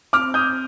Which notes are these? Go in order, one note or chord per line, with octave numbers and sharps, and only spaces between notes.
C4 D6 F6
D#6 G6